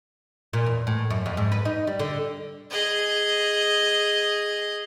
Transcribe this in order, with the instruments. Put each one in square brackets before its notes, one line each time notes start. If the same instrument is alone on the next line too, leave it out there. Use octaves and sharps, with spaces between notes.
[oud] A#2
E2
A2
F#2
F2
G#2
B4
D#4
G3
D3
[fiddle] G#4 D#5